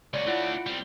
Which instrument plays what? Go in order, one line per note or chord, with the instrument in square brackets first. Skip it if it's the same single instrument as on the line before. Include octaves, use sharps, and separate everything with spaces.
[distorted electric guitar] C#2 F#4 [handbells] C#5 D5
[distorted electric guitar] A3 D4 [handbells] E4 F4 F#5
[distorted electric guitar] G3 C4